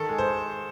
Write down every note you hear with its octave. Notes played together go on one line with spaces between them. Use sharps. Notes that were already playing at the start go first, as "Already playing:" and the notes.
Already playing: D#3 A4
G#3
C5